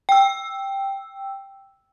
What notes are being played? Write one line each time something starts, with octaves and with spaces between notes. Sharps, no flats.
G5 E6